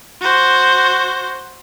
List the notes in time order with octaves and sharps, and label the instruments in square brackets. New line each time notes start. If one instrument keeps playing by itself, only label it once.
[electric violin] F#4 C5